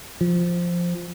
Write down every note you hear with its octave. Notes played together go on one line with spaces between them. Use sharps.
F3